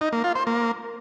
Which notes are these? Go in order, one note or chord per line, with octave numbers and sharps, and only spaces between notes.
D#4
A#3
F4
C5
A#3